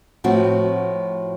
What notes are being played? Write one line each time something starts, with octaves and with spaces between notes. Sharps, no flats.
A2 F3 C4 F#4